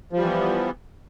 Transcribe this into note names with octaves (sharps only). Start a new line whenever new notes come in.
E3 F3 G3 B3